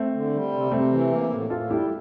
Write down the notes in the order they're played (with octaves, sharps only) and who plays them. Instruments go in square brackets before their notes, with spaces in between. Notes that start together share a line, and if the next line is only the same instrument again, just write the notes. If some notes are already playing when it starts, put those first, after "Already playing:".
Already playing: [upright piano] A3 C4
[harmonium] D3
G3
C3
[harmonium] C3 [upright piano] A3 C4
[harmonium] E3
A#3
A2
[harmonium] A2 [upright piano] F4 A4
[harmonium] G3 [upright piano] E4 G4